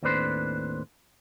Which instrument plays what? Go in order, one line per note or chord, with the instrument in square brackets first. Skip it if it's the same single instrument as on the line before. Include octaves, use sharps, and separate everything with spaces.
[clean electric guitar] D#2 A2 C4 D4 B4 C5